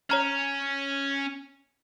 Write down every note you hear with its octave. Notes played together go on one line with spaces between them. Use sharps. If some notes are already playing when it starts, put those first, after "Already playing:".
C#4 C#5 A#5 F6